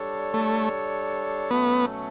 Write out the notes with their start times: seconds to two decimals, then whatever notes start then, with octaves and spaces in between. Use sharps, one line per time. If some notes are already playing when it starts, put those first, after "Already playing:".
Already playing: G3 D4 A4 C#5
0.34 A3
1.51 B2 F#3 A3 B3 C#4